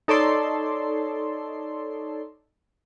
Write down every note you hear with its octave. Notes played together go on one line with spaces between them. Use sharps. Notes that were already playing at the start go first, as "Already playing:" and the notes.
D#4 A4 C#5 D5 C6